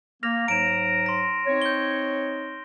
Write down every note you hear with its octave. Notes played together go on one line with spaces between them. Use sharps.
A#3 F6 A#6 F7
G#2 F#3 A#5 D7 E7
C6 A#6
C4 D#4 C#5
G6 G7